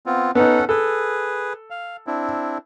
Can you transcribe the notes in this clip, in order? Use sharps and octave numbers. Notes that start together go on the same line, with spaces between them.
B3 C4 F4
B3 C#4 D#4 A4 F#5
G#4 A4 B4
F5
C4 D4 E4